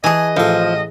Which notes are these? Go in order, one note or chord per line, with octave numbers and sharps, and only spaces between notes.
E3 G#4 D#5 G#5 A5
A1 F3 A4